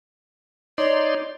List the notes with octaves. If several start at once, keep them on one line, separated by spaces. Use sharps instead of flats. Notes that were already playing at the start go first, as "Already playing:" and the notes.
D#4 C#5 D5 C6